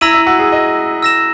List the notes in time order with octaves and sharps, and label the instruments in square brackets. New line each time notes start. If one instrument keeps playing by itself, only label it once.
[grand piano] E4 [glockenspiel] A#5 E6 A#6 D#7 F#7
[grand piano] E4
F#4
G#4
D#5
[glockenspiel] E6 A#6 E7